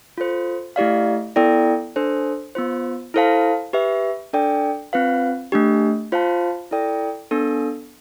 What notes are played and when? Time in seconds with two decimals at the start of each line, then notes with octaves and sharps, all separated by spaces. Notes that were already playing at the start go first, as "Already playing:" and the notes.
0.18 F4 A4 C5
0.76 A3 E4 G4 D5 F5
1.36 B3 E4 A4 D5 G5
1.96 D4 A4 C5
2.55 B3 F4 C5
3.14 E4 A4 C5 F5 A5
3.73 G4 B4 E5
4.33 D4 A4 D5 G5
4.93 C4 F4 B4 F5
5.52 A3 D4 G4
6.12 F4 C5 F5 A5
6.71 E4 A4 D5 G5
7.31 B3 D4 A4